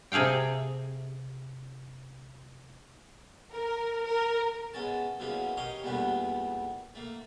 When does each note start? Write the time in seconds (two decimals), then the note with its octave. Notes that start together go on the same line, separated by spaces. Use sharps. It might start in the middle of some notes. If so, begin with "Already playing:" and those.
0.12 C3 G#4 A4 F5 G5
3.51 A#4
4.05 A#4
4.74 G#3 B3 C#4 A5
5.20 F#2 B2 G#3 A#3 C#4 E4
5.57 G4 A#4 C#5 D#5 F5
5.83 E2 A#2 G3 A3 B3 D4
6.95 A3 A#3